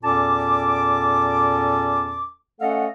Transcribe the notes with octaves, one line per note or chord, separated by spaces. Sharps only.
E2 A#2 C#4 A4 A5 D6
A3 C#4 A4 D#5 F5 F#5